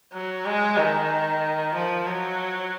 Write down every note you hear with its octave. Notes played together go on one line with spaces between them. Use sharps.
F#3
G#3
D#3
F3
F#3